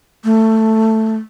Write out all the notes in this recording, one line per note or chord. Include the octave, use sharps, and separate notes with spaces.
A3